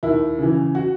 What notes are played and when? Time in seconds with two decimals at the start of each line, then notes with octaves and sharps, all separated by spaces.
0.03 D#2 E4
0.39 C#3 E3
0.75 F#4